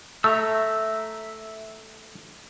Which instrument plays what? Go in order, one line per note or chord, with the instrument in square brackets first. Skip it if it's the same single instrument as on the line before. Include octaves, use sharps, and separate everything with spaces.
[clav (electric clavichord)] A3 [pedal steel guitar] E5 A#5 E6